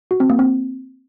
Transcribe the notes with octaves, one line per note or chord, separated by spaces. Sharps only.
F#4
C4
A#3
C4